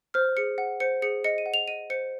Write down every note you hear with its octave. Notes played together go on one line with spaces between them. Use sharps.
C5 F6
G#4 C#7
F#5
C5 C#7
G#4 C#7
D#5 C#7
D#7
F#5
F7
D#5 D#7
C5 C#7